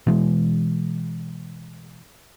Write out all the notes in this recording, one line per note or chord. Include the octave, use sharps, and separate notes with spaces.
B2 E3 G#3